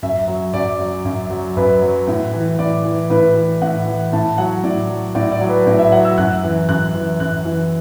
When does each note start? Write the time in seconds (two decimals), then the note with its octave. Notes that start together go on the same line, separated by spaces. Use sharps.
0.03 F#2 E5
0.28 F#3
0.54 F#2 D5
0.80 F#3
1.05 F#2
1.30 F#3
1.56 F#2 B4
1.82 F#3
2.08 A2
2.33 E3
2.59 A2 D5
2.85 E3
3.10 A2 B4
3.36 E3
3.62 A2 F#5
3.87 E3
4.13 A2 A5
4.38 F#3 F#5
4.64 A2 D5
4.90 F#3
5.15 A2 D5
5.32 D5
5.41 F#3
5.49 B4
5.67 A2 D5
5.79 E5
5.92 F#3 F#5
6.05 E6
6.18 F#2 F#6
6.44 E3
6.69 F#2 F#6
6.94 E3
7.20 F#2 F#6
7.45 E3